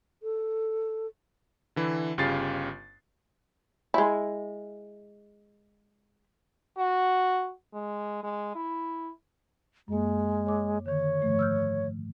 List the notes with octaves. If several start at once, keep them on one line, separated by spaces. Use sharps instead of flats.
A4
D3 E3 E4
G1 C#3 F4 G4 A6 C7
G#3 E4
F#4
G#3
G#3
E4
F#2 G#3 A#3
C#5 D6
D3 D#3 C#5
G#2 F3 A3
E6 F6 G6